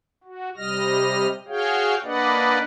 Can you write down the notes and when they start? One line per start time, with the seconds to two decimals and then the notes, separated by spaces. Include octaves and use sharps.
0.24 F#4
0.57 C3 G3 D#5 F6 A#6
1.48 F#4 G#4 C#5 F5 G5
2.04 A#3 D4 B4 D5 D#5 F#5